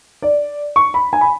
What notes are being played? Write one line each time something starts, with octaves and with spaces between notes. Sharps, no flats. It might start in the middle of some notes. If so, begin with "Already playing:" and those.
D5
C#6
B5
G#5
B5